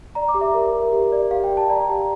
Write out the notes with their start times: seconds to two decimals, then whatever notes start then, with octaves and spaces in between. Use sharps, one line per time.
0.15 D5 A#5
0.28 D6
0.34 G4
0.41 E5
0.54 A#4
0.73 A#4
0.92 G4
1.12 D5
1.31 G4 F5
1.44 G5
1.50 G4
1.57 A5
1.70 D5 A#5
1.89 G4